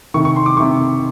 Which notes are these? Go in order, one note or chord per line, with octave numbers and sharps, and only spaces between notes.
C3 D#3 C#6
C#6
C6
D6
C3 D#3 C#6